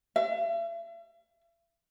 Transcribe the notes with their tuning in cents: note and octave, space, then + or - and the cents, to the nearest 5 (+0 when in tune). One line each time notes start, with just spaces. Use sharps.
E5 +40